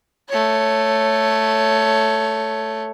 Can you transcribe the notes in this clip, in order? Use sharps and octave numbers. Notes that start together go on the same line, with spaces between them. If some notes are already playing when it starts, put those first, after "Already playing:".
A3 C#5